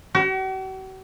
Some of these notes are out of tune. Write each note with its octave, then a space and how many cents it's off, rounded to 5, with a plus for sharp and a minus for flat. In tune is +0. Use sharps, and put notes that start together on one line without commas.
F#4 +45